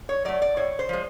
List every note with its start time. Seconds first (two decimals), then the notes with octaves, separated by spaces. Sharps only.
0.09 C#5
0.25 F#3 A3 D5
0.42 D5
0.57 A2 C#5
0.79 C5
0.89 F3 G#3